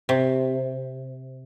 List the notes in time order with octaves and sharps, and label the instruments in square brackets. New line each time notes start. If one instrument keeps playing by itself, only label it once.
[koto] C3